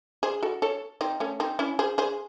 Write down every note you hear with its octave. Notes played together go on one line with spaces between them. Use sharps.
G#4 C5
F#4 A4
A4 C#5
C4 D#4
A3 C#4
C4 D#4
C#4 E4
G#4 C5
G#4 C5